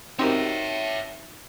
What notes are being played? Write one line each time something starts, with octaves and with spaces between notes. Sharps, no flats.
C4 D#4 F#4 G4 A#4 C#5 E5